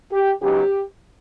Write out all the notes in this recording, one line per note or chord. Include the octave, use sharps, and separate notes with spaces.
G4
C#3 F#3 B3 D#4 G4